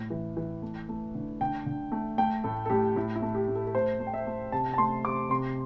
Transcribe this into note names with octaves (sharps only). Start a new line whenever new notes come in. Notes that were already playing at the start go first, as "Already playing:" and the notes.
Already playing: A2
E3
E3
A3
A3
D3
D3 G5
D3
A3
A3 G5
A2 A4
A4
A2 G4
A2 E4
E4
A3
G4
A2
A4
A4
A3 C5
A3
G5
E5
A3
C3 A5
A5
A3 C6
C3 D6
C3 C6